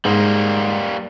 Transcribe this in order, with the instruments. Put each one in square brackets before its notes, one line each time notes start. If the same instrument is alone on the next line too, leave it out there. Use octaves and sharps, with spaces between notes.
[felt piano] G#2 [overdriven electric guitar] G3 A#3